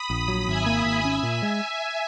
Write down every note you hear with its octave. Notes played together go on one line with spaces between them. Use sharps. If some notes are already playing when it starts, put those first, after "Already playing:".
Already playing: B5 D#6
A#1
F#3
G#1 E5 G#5
A#3
E5 G#5
G#1
C#4 E5 G#5
A#2
G#3